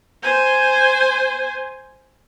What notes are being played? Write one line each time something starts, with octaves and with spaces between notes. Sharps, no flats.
C5 G#5